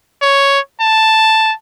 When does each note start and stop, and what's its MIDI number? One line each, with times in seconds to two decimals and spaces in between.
0.22 0.59 73
0.81 1.53 81